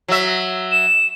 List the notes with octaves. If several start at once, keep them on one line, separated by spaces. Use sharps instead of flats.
F#3 E5
E7